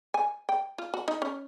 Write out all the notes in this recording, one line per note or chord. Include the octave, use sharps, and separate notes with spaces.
G#5
G5
F4
F#4
D#4
C#4